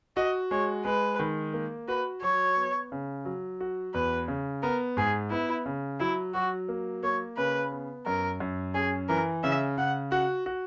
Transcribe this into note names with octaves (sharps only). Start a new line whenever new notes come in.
F#4 D#5
G#3 C#5
G#3 B4
D#3
A#3
F#4 B4
F#3 C#5
B3
C#3
F#3
F#4
E2 B4
C#3
B3 A#4
G#2 G#4
B3 E4
C#3
F#3 E4
F#3 F#4
A#3
A#3 C#5
C#3 B4
B3
F#2 A#4
F#2
C#4 G#4
E3 A#4
C#3 E5
C#3 F#5
F#4 F#5
F#4